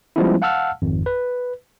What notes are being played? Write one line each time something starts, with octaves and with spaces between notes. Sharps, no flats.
F3 G3 G#3 B3 C#4 E4
F5 F#5 A5 E6 F6
G#1 F2
B4